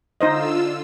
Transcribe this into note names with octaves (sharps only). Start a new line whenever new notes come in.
D3 D#4 F4 C5 D#5 E6